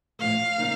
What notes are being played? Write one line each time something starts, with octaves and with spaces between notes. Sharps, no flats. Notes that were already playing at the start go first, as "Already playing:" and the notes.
A2 F3 A3 F5
C#3 F3 A#3 D#4